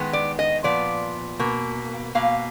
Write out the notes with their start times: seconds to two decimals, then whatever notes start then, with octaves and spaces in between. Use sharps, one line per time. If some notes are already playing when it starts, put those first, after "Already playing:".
Already playing: D#3 G#3 B3
0.13 D5
0.39 D#5
0.64 A#2 F3 B3 D5
1.39 B2 A#3
2.15 B2 A#3 F5